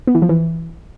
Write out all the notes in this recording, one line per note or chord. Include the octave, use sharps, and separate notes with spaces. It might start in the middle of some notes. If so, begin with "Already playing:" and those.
B3
E3
F3
E3